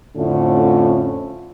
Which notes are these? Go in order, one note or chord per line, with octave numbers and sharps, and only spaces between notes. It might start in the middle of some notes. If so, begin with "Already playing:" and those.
F2 A2 D3 A3 C#4 F4